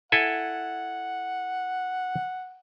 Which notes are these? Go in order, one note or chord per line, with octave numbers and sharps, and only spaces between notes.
E4 A4 F#5 G#5